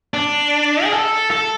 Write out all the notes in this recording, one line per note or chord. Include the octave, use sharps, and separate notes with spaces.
D4
G#4
A4
A4